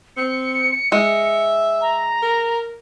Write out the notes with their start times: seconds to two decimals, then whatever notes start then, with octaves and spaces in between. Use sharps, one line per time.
0.17 C4 C#7
0.92 G#3 E5
1.81 A#5
2.22 A#4